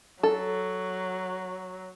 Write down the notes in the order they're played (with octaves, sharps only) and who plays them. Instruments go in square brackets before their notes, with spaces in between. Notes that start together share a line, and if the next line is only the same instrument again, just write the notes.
[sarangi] F#3 [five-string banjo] A4